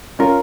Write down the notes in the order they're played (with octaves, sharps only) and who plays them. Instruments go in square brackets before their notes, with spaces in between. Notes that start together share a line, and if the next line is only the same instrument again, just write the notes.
[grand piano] C#4 F4 [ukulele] A#4